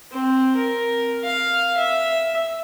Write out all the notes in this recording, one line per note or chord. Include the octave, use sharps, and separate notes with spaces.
C4
A#4
F5
E5